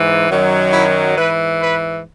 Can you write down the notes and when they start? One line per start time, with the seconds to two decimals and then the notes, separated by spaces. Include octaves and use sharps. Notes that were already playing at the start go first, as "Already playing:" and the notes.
Already playing: G#2 E3
0.30 F#2 D#3 F#3
0.73 E4
1.16 G#2 E3 B4
1.60 B4